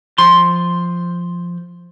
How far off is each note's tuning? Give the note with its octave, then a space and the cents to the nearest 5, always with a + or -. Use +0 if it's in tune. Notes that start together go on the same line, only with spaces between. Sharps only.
F3 +0 C6 +0